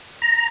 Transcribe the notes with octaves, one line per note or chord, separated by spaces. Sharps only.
A#5